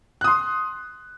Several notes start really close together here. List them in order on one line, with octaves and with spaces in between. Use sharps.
F#6 D#6 C6